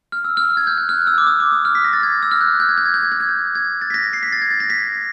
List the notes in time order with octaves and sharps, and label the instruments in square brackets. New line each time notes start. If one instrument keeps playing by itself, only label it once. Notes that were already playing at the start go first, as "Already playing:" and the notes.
[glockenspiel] F6
E6
F6
G#6
G6
F#6
F6
E6
D6
D#6
D6
D#6
F6
B6
A#6
A6
G#6
E6
F6
F#6
G6
G#6
G6
G#6
G6
G#6
G6
G#6
G6
G#6
A6
B6
A#6
B6
C7
B6
A6
G#6
A6
A#6
B6